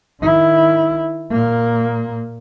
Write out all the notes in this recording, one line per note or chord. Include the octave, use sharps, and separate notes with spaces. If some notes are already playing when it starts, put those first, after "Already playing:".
D#3 E4
A#2 A#3